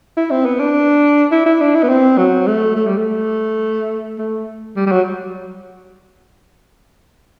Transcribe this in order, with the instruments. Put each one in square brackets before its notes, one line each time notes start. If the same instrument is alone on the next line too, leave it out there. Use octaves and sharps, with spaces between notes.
[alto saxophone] E4
C4
B3
D4
E4
E4
D4
E4
B3
C4
F#3
A3
A3
G3
A3
A3
G3
G3
F#3